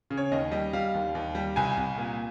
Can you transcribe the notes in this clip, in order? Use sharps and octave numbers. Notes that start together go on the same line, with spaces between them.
C#3
C#5
D#2 D#5
G3 D#5
G3 F5
D#2
D#2
G3
C2 G#5
C2
A#2